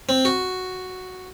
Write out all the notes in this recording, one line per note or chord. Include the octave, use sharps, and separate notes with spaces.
C4
F#4